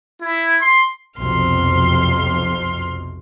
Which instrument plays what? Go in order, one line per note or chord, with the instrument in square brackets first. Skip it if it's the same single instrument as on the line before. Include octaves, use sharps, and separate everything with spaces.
[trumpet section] E4
C6
[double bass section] B1 F2 C3 [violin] C6 F6